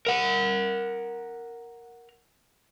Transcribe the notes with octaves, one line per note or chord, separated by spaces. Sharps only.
A#4 F#5